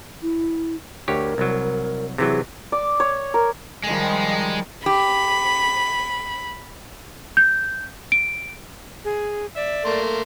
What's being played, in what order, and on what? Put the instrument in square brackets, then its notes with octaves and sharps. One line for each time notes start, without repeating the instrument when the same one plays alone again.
[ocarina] E4
[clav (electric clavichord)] D2 G4 C#5 [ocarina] A#4
[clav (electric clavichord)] C2 F#3
[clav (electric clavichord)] C3 E3 F#3 [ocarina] G#4
[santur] D5
C#5
A#4
[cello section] D#3 F3 G3 [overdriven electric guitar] G#3
[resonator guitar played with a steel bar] G4 [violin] B5
[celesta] G6
D7
[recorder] G#4
[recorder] D5 [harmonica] E5
[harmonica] A3 A#3 C6